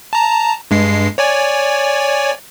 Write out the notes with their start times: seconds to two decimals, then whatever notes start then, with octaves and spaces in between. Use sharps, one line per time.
0.13 A5 A#5
0.71 G2 G#3 C7
1.18 C#5 D5 G#5